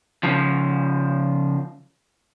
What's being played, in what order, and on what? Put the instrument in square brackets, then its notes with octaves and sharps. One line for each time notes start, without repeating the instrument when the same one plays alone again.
[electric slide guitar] C#3 F3